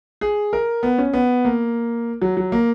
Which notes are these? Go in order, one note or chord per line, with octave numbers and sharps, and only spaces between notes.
G#4
A#4
B3
C#4
B3
A#3
F#3
F#3
A#3